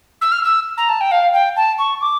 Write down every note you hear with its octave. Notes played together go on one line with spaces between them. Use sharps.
E6
F6
E6
A#5
A5
G5
F5
G5
A5
C#6
D6